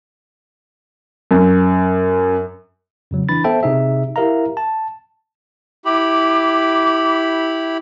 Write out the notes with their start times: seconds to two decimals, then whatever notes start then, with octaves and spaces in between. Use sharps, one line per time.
1.31 F#2
3.11 F2 C#3 F#3
3.29 E3 D4 B5 A6
3.44 B3 A4 C5 E5 G5 A5
3.63 C3 D#4 G#4 E5
4.16 E4 G4 A#4 E5 F5 A#5
4.57 A5
5.85 E4 G4 B5 D6